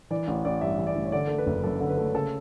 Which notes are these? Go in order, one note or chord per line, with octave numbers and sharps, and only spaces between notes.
E3 D5
A1
A1 D5
G2 E5
E3
D5
A1
C#5
D3 D5
A3 A4
B4
F#1
F#2 A4
D3
B4
A3
C#3 A4